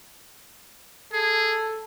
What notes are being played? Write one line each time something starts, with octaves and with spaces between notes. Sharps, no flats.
G#4 A4